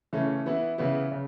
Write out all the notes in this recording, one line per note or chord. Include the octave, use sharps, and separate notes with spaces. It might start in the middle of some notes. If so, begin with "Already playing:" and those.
C#3 E3 A3 C#4
E3 B3 E4
C#3 E3 B3 E4
C#3